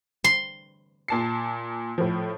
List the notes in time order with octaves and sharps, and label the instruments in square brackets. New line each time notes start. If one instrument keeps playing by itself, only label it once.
[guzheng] C6
[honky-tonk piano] A#2 A5 C7
A2 F3